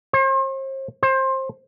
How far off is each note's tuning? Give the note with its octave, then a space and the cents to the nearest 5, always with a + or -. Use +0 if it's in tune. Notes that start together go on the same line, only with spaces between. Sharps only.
C5 +40
C5 +20